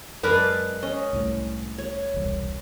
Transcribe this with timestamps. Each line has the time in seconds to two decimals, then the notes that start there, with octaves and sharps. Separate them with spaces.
0.23 F#2 G#3 A#4 B4 D5 A5
0.83 C#4 D#5
1.13 C2 A2
1.78 C#5
2.14 E1 C2